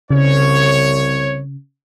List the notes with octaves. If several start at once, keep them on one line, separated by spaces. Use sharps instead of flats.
C2 C#3 C#5